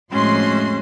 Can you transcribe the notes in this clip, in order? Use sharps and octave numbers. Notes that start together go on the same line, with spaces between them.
F2 A2 G#3 C#4 F#4 C6